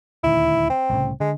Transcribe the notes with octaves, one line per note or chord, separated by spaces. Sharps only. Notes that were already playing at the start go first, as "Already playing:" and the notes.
D#1 D2 D#3 E4
C4
C2 A2 C#3
D3 G#3